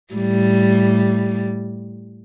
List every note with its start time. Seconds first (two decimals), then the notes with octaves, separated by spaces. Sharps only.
0.14 A2 G3